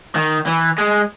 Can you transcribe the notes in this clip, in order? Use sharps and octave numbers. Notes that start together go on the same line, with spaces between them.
D#3
E3
G#3